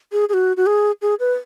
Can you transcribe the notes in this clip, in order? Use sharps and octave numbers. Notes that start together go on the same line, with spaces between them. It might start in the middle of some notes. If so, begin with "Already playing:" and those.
G#4
G#4
F#4
F#4
G#4
G#4
B4